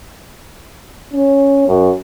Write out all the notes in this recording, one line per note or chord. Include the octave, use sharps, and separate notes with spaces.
C#4
F#2